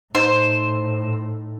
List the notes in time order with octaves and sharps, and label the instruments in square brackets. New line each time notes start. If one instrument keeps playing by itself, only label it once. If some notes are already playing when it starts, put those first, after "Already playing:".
[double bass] A2 [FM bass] D#4 [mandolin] C5